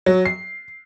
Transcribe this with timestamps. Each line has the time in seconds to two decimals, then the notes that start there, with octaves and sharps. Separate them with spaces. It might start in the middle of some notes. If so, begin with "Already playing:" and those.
0.06 F#3
0.25 C7